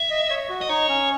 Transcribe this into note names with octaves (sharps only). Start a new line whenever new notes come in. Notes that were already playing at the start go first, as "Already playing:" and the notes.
Already playing: E5
D#5
D#5
C#5
F#4
D#5
D#4 C#5
C#4